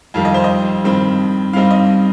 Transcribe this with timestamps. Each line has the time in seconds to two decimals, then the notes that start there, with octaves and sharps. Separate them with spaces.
0.14 F2 D#3 G3 F5
0.25 D#5
0.34 C5
0.44 D#5
0.84 G2 D#3 C4
1.53 G2 G3 C4 D#4 F5
1.71 D#5